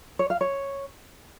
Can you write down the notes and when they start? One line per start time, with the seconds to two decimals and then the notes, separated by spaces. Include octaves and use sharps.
0.19 C#5
0.30 F5
0.41 C#5